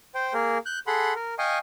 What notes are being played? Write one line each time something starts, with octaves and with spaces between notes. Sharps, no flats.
C5 G5
A#3 G#4 A#4
F#6 G6
G#4 A4 F#5 B5 C6
A#4
D#5 F5 G5 G#5 C#6